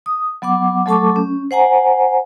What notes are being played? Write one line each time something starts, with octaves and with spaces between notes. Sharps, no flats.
D#6
F#3 B3 F#5 D6
F#3 A3 A4 A5 C#6 D6
C#4
C5 F#5 G#5 A#5